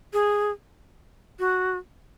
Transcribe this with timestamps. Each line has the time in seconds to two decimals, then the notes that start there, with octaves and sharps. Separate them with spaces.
0.13 G#4
1.39 F#4